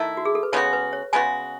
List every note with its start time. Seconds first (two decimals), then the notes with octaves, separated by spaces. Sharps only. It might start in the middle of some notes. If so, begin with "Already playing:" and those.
Already playing: D#3 A3 E4
0.17 F#4
0.25 G#4
0.35 A4
0.43 B4
0.53 C#3 G#3 B3 F#4 C#5
0.73 B4
0.93 C#5
1.13 C#3 G#3 B3 F#4 G#5